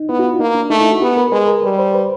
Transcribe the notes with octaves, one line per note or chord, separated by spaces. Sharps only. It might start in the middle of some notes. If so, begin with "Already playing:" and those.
Already playing: D#4
B3 E4
F#4
F4
A#3 D#4
D4
A3 D#4
E4
F#4
B3 G4
A#4
G#3 B4
A#4
G3 B4
C5
B4